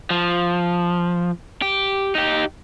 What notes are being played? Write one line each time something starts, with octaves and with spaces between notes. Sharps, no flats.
F3
G4
D#4 G4